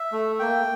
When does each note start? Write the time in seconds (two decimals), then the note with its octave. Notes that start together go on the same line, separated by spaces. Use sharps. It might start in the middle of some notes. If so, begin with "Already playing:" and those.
Already playing: E5
0.12 A3
0.39 A#3 G5